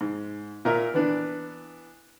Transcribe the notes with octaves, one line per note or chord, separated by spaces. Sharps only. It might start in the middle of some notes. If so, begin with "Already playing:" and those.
G#2
A#2 A#4 E5
E3 B3 D4